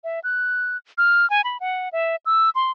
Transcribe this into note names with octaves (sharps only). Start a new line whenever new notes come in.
E5
F#6
F6
G#5
B5
F#5
E5
E6
C6